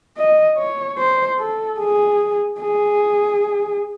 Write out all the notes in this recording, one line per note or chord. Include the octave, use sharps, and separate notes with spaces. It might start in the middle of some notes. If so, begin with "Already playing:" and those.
D#5
C#5
C5
A4
G#4
G#4